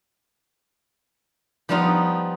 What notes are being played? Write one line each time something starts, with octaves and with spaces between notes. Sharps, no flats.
F3 G3 B3 D#4 F4